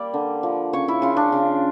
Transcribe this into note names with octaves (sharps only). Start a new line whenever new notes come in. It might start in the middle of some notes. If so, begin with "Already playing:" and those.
Already playing: G3 A#3 D5
D3
F3
C#3 C#5
E4
C#3 F4
D4
C#3